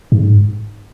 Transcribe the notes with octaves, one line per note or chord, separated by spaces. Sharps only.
G#2